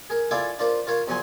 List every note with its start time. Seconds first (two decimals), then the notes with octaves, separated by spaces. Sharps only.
0.10 G#4 A#4
0.31 E4 F4 G#4 A4 D5 F5
0.59 D4 F4 A#4 C5
0.87 F4 A#4 C#5 F5
1.08 E2 F3 F#3 F#5 G#5 C6